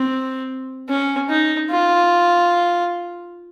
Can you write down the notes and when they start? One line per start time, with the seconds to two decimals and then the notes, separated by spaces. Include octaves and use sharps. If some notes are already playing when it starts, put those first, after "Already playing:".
Already playing: C4
0.89 C#4
1.29 D#4
1.70 F4